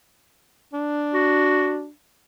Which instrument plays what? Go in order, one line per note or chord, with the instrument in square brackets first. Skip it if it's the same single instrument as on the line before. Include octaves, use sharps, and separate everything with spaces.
[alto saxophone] D4
[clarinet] F#4